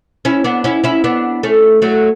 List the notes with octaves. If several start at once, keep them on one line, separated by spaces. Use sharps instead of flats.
C#4 E4
B3 D4
C#4 E4
C#4 E4
B3 D4
A3 C#4
F#3 A3